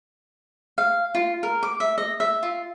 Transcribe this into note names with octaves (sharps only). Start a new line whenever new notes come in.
F5
F4
A#4
D6
E5
D#5
E5
F4